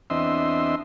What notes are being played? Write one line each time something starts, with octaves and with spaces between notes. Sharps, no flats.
E2 C4 D4 D#5 E5 C6